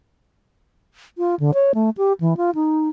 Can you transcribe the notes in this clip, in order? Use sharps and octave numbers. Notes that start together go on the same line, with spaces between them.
F4
D3
C#5
A3
G4
E3
F4
D#4